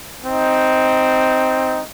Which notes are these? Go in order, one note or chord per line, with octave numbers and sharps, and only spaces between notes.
C4 D#4